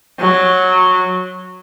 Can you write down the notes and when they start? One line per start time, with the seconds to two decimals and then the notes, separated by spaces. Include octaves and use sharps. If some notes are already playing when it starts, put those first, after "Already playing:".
0.20 F#3